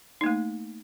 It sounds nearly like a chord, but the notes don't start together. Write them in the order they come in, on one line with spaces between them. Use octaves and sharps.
D#4 A#3 A3